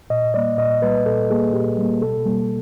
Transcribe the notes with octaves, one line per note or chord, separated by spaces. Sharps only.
A#2 D#5
G3 A#3 D5
A#2 D#5
G3 A#3 B4
A#2 A4
G3 A#3 G#4
A#2 G4
G3 A#3
B2 A4
G3 A#3